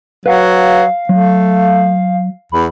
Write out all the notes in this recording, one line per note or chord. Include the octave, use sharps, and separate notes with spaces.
F#3 B4 F5 F#5
F#3 A3
E2 B5